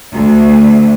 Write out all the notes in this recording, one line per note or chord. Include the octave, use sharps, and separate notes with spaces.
D2